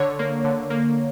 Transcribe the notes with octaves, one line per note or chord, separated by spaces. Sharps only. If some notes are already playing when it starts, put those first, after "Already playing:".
Already playing: D3 C#5
A#3
D3
A#3